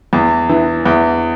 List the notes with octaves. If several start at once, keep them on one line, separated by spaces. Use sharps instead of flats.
E2
E3
E2